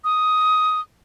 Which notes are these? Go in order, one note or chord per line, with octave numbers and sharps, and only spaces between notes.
D#6